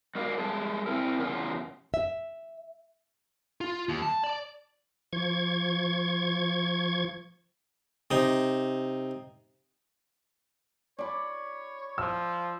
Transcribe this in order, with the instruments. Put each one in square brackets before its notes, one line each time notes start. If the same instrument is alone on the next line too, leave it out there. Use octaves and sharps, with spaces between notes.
[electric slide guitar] G#3 F#4 A#4 D5 D#5 F5
G3 G#3 G#4 A4
C4 E4 A#4
E2 C#3 F4 G#4
[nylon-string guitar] E5
[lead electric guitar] F4
D#2
A5
D5
[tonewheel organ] F3 C#6 G#6
[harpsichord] C3 D#4
[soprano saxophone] C#5 [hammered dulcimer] D5 B5
[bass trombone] F3 [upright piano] E6